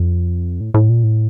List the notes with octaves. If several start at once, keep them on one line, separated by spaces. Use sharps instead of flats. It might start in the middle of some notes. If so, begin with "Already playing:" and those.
Already playing: F2
A2
A2
A#2
A2